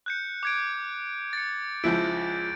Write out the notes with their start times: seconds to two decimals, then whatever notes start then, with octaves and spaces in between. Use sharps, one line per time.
0.06 F#6 G6 C#7
0.43 D6 G#6 D7
1.33 A6 C#7
1.84 C#2 F3 E4 G6 D7